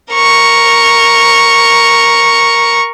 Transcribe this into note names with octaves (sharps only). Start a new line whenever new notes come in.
A#4 C#6